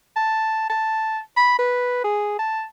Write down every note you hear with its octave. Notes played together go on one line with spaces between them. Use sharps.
A5
A5
B5
B4
G#4
A5